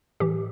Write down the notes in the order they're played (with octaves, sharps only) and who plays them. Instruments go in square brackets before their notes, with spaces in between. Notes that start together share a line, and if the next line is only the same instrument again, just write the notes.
[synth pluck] A2 E3 G4